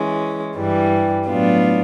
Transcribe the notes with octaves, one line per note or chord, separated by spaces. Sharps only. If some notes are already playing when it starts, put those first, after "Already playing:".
Already playing: E3 G#3 C#4
G2 E3 G3
A2 F#3 B3 D4 F4